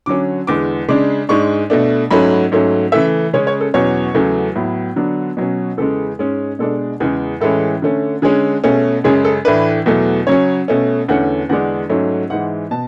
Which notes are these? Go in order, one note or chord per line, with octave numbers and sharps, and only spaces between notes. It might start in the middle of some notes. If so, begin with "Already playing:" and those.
D3 F#3 C#4 D6
E2 D3 G#3 D6
C#3 G#3 D4 D6
G#2 G#3 D4 C#6
B2 A3 D4
G#2 F#3 A3 C#4 B5
G#2 F#3 A3 C#4
C#3 E3 A3 E5
C#3 G#3 C#4 C#5
C#5
A4
E2 B2 F#3 C#4 C#5
E2 C#3 F#3 A3
A2 F#3 B3
D3 F#3 B3 D4
B2 F#3 C#4
E2 C#3 G#3 A4
G#2 G#3 C#4
B2 G#3 D4 A4
E2 C#3 G#3 G#4
A2 E3 G#3 C#4 A4
D3 A3 C#4
D3 G#3 C#4 G#4
B2 A3 C#4 G#4
F#2 C#3 G#3 C#4 G#4
A4
A2 E3 A3 D4 B4
E2 B2 F#3 A3
C#3 F#3 C#4 C#5
B2 A3 C#4
E2 D3 A3 C#4 F#5
E2 D3 G#3 D4 F#5
G#2 F#3 A3 C#4
G#2 E3 G#3 F#5
B2 A5